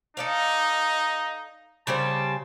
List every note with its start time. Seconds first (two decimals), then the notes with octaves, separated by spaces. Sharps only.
0.17 D#4 A4 D5 F5
1.87 C#3 G3 C4 A5